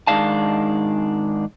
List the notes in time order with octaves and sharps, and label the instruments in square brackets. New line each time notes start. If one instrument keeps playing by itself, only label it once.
[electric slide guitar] G#2 D#3 G#3 D4 F5 A5